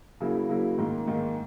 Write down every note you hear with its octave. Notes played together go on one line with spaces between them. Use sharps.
C#3 F#3 A#3 E4
C#3 F#3 A#3 E4
G#2 D#3 A#3
G#2 D#3 A#3